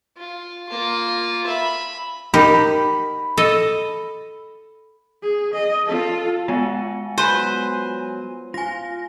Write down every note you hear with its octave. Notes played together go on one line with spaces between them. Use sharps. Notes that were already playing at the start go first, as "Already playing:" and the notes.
F4
A#3 F4
E5 B5
D#4 G4 A#4 B5
A4 D#5
G#4
D#5
F4 A4
G#3 B3 F4 F#5 G#5 A5
F#3 B4 C5 G#5
F4 G#5 A#6